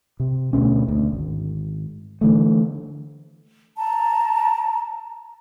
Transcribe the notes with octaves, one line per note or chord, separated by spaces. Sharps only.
C3
D2 B2 C#4
D2
G#1
D3 E3 A3
A5 A#5